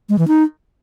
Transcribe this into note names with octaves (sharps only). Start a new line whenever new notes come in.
G#3
E3
D#4